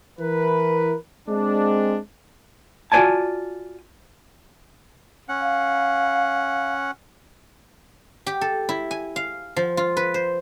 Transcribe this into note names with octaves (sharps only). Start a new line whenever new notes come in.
E3 A#4 B4
G#3 C4 D4
F4 F#4 C5 D5 G#5 A5
C#4 F#5
F5
G4
A4
E4
G#5
F5
F3
F4
B4
C5